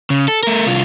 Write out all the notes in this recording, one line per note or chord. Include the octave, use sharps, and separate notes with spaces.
C#3
A4
A3 A#4
C2 F4